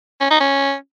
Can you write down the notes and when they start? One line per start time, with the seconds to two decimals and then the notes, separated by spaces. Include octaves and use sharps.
0.21 C#4
0.30 D#4
0.40 C#4